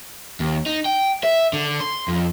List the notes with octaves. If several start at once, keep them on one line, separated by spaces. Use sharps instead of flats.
D#2
D#4
G5
E5
D3
C6
F2